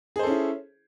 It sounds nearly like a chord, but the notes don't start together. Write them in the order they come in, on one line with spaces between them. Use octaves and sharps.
G#4 C5 A4 C#4 E4